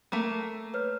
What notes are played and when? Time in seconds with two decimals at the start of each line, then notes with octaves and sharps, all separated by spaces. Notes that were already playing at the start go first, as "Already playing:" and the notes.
0.12 A3 A#3
0.74 B4 C#5 F6